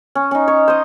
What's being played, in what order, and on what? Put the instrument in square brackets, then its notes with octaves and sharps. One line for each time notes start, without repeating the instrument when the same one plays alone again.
[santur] C#4
C#4 D#4
C#5
C5 D#5